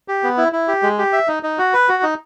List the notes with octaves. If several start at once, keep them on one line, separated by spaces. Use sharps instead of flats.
G4
B3
E4
E4
G4
G#3
G4
E5
D#4
D#4
F#4
B4
F#4
D#4